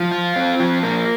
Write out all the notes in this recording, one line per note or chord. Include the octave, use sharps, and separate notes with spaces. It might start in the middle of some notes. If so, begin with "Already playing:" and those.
Already playing: F3
F4
C4
F3
A#3